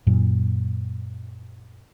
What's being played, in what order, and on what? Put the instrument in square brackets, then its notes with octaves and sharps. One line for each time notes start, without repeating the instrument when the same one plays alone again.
[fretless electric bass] F#2 A#2 F#3